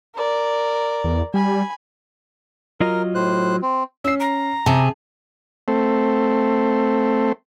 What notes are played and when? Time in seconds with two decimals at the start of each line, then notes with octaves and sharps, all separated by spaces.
0.15 A#4 D5
1.04 E2
1.34 G3 G#5 B5
2.80 F#3 F4 A#4 D#5
3.15 A2 C5 F#6
3.62 C4
4.04 C#4 E6 C7
4.20 A#5
4.66 C3 G#4 A5
5.68 A3 C4